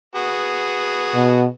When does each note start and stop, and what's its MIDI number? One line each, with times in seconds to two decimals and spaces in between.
0.15 1.51 59
0.15 1.51 66
0.15 1.51 68
1.15 1.46 47